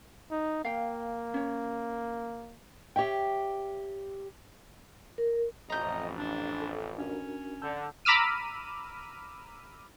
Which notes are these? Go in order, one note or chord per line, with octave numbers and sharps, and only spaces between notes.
D#4
A#3 F5 G5
C#4 C#5
G4 C#5 E5 G5
A#4
A1 F2 D#5 A#5 G6
D4
A4
C#4 D4 F#4 A#4
D3 A5 E6 G6
A#5 B5 D6 E6 F6 D#7